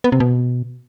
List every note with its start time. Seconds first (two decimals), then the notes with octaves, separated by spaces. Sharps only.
0.04 B3
0.12 C3
0.20 B2